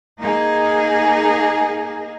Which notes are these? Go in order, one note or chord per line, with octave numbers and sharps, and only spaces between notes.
A#3 D#4 G#4